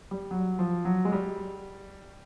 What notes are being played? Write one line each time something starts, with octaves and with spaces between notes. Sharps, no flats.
G3
F#3
F3
F#3
G#3
G3